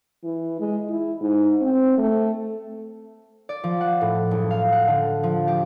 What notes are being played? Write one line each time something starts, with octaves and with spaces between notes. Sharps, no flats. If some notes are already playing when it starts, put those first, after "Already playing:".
E3
G#3
E4
G#2
C4
A3
D5
F3
F#5
A2
F#1
F5
F#5
D3
F3
G4